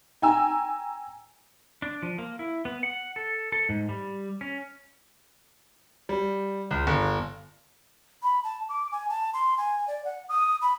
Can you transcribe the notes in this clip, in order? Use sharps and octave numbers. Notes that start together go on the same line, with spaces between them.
G5 G#5 A#5 E6
D4
F3
A#3
E4
B3
F#5
A4
A4
G#2
G3
C#4
G3
C#2
G1
B5
A5
D6
G#5
A5
C6
G#5
D5
F#5
D#6
B5